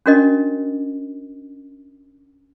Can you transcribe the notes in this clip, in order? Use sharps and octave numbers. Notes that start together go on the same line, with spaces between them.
C#4 D4 F#4 A#4 C#5 D#5